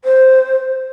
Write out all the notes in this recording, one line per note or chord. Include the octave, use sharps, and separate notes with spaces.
C5